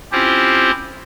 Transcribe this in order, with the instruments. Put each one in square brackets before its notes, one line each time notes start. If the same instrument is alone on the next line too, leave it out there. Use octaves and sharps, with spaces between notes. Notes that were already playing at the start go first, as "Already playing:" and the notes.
[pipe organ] C4 C#4 E4 F4 G4 C5